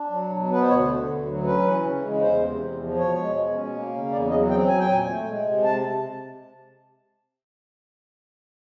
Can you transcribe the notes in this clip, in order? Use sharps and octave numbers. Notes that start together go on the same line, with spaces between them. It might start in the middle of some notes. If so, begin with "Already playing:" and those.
Already playing: D4
F#3
B2
B3 B4
C5
D2 C#5
D3
D2
F#3
C#4 B4
E3
C#3
G#3
E2 C5
C3
E2
F3
B2 C#5
G#3
B2
C#4
A#3
C#3
E2 D5
F#3 D#5
C4 G5
F#3 G#5
G5
A#2 G#5
A3
G#3
C3
A5